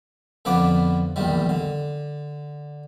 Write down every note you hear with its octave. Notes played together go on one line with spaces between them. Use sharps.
F2 D3 F3 B3 B4 D6
A#1 E2 D#3 G3
D3